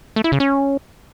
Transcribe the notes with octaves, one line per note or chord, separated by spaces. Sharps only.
A3
E4
C#3
C#4